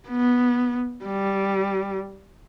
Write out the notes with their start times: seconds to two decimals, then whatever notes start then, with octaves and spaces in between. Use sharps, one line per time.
0.09 B3
1.05 G3